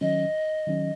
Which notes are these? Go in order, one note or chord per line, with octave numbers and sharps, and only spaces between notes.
D#3 F#3 C#4 D#5
D#3 F#3 C#4